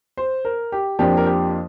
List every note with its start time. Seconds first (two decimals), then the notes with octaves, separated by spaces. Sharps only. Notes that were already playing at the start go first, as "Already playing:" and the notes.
0.17 C5
0.45 A#4
0.72 G4
0.99 F2 F3 A#3 D4 G4
1.17 A#4
1.26 G4